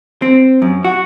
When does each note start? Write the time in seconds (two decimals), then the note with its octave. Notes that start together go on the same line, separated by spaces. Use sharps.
0.22 C4
0.62 F#2
0.85 F#4